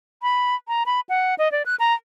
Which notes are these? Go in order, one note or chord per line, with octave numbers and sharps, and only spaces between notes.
B5
A#5
B5
F#5
D#5
D5
F#6
A#5